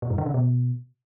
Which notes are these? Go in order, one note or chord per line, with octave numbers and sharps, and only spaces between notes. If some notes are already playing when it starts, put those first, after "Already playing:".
A#2
G2
D3
C#3
B2